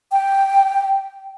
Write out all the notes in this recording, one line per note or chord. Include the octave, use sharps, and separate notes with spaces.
G5